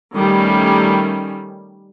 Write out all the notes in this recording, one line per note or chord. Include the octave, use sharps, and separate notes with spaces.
D#3 G3 A3 C#4